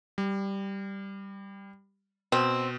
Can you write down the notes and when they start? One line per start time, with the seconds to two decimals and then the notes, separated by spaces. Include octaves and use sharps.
0.18 G3
2.32 B2 C4